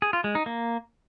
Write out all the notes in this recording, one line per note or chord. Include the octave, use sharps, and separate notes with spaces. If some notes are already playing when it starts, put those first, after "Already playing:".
G#4
F4
G#3
D#4
A#3